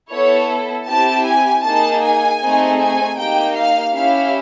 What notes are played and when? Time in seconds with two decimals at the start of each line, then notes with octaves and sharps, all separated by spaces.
0.10 B3 E4 A4 C#5
0.87 C4 E4 G4 A5
1.25 G#5
1.63 A#3 D#4 G#4 A5
2.03 G#5
2.41 A3 C4 D#4 G#4
2.80 G#5
3.17 A#3 D#4 G4 G5
3.56 F5
3.94 C#4 E4 G4 F5